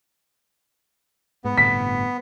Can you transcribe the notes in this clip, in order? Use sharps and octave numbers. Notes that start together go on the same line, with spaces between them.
G#2 B3
G1 A2 C3 B6